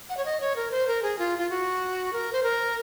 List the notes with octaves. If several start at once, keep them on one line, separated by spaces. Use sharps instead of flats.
F#5
C#5
D#5
C#5
A#4
C5
A#4
G#4
F4
F4
F#4
A#4
C5
A#4